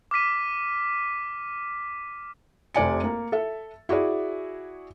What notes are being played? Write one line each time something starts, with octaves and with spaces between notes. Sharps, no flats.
D6 F6 B6 D#7
F1 C3 D5 G#5 C#7
A#3
A4 E5
E4 F#4 G#4 D5